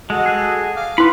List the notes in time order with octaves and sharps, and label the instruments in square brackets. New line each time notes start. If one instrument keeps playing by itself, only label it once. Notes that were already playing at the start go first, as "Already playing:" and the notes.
[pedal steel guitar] G#3 [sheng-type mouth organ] F#4 A4 D#5
[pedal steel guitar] G#4
[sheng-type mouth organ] F5 D6 F6
[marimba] E4 C6 [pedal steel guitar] B4 B5